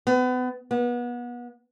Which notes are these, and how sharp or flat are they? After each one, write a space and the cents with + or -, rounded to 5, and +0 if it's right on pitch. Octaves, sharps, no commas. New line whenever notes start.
B3 +30
B3 -30